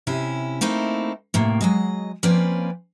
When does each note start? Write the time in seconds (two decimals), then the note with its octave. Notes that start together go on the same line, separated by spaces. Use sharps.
0.07 C3 C#4 E4
0.61 A3 A#3 C4 D#4 E4
1.34 A2 C3 A#3
1.61 F#3 G#3 D#5
2.23 F3 A#3 C4 C#4 B4 D5